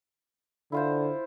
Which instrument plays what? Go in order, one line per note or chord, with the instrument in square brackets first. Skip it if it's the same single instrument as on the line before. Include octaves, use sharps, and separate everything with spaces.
[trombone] D3 [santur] E4 F4 C5